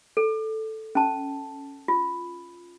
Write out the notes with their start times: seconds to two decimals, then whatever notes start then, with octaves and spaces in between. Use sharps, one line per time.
0.17 A4
0.95 C#4 A5
1.88 F4